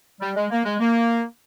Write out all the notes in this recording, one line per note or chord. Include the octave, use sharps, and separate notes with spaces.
G3
G#3
A#3
G#3
A#3